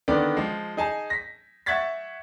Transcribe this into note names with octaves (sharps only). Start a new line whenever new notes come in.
D3 D#3 B3 D5
F3 G#3
D#4 G#4 G#5 A5
A#6 B6
E5 F#5 C#6 G#6 A6 B6